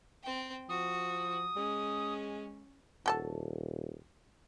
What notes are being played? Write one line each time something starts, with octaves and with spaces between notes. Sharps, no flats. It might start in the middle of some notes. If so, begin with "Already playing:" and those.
C4 G5
F3 F#4 D#6
G#3 C#4
D#1 F#4 A4 A5